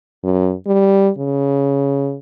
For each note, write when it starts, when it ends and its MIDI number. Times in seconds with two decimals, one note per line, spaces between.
0.24 0.53 42
0.67 1.09 55
1.18 2.17 49